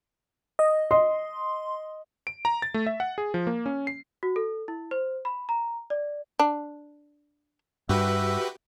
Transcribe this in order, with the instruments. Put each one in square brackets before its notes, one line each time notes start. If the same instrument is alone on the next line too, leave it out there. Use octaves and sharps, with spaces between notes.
[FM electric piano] D#5
[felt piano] D#5 [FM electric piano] C6
[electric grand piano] D7
A#5
A6
A3
E5
F#5
G#4
F3
A#3
C#4
C7
[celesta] F#4
A4
E4
C5
B5
A#5
D5
[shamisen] D4
[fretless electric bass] G2 [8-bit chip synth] F#4 G4 B4 [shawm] E5